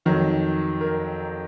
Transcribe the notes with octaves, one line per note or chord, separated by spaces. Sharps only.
F2 D#3 F#3
A#4